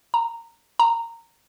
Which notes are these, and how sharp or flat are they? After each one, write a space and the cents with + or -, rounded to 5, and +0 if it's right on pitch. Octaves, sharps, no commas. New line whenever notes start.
A#5 -15
A#5 -15